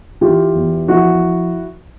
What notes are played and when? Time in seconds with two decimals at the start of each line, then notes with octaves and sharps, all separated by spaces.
0.21 E3 F4 G4
0.55 E2
0.88 F3 E4 F#4